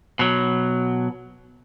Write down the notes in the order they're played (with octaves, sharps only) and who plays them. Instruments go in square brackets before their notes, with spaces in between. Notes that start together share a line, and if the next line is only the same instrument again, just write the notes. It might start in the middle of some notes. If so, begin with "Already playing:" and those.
[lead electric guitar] B2 F#3